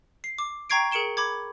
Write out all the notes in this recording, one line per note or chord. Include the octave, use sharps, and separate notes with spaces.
C7
D6
G5 A#5 C#6 G#6 C7 D7
G#4 A#4 C#7 D7 E7 G7
B5 D6 G#6